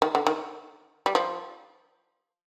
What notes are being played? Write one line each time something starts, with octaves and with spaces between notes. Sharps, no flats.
D#3
D3
D#3
G3
F3